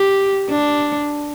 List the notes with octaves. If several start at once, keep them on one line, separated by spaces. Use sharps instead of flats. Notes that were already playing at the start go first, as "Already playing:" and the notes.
Already playing: G4
D4